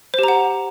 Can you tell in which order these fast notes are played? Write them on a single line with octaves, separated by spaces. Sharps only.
C5 G4 A#5 F#5